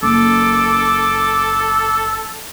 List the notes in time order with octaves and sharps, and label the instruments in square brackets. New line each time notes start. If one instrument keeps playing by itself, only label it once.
[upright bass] F#1 [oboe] A4 [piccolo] D6